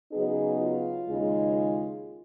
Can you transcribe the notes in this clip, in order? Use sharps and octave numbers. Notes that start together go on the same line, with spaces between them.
C#3 F#3 B3 D#4 G#4
F4
D#2 C#3 G#3 D#4